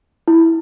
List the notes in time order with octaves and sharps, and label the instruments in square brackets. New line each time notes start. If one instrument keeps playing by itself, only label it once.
[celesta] E4